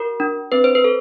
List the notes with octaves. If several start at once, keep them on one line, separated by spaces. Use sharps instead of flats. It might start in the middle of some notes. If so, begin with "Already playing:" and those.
Already playing: F#4 A#4
D4
C4 B4
C5
B4
A4